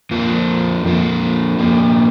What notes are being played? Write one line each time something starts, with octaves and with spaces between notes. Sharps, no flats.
F2 F3 A#3 F4
F2 F3 A#3 F4
F3 A#3 G4